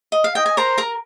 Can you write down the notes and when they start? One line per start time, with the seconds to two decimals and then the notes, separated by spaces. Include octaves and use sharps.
0.12 D#5
0.24 F5
0.35 D#5 G5
0.46 G#5
0.57 A#4 C5 A#5
0.78 A#4 A#5